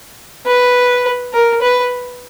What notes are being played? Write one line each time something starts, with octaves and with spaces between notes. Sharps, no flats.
B4
A#4
B4